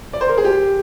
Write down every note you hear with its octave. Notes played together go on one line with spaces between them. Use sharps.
D5
C5
A#4
G#4
G4